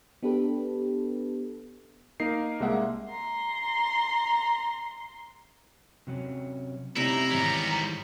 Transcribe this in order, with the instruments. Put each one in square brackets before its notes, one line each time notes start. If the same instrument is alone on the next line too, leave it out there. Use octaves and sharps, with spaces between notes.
[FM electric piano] B3 D4 G4 A4 B4
[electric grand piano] A#3 D#4 A#4 C7
C2 G#3 A#3 E5 F#5
[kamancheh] A#5 C6
[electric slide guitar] C3 F#3 C#4
[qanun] C3 G3 [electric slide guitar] A3 C#4 D#4 [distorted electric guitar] E4 [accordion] A#5
[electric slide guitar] G#2 D#3 E3 [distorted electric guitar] G3 B3 [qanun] C#5